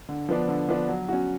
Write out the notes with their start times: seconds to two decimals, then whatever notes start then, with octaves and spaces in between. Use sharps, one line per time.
0.09 D3
0.29 F3 B3 D4
0.49 D3
0.69 F3 B3 D4
0.89 F#3
1.09 C#4 F#4